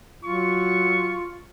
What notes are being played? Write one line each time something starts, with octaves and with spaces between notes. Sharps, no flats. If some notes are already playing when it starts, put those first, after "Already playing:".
F#3 F4 C#6